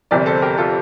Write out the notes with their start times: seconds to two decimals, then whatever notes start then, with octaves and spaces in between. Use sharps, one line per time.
0.11 G1 F2 C3 A#4 D5
0.26 A4 C5
0.42 G4 A#4
0.58 F4 A4